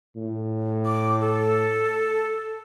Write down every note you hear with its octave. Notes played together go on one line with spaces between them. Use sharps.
A2
D6
A4